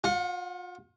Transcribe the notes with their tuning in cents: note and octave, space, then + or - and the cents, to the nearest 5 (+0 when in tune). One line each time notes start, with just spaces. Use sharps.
F4 +35 F#5 -10